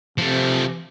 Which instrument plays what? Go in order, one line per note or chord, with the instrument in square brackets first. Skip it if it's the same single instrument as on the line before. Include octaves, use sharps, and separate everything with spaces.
[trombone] C3 [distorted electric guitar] F3 A3